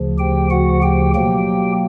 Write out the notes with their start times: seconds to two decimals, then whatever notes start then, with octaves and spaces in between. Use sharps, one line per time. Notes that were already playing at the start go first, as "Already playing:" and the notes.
Already playing: D2 C#3 F3
0.18 G4 G5
0.50 F#4 F#5
0.82 G4 G5
1.14 B2 F#3 A#3 G4 G5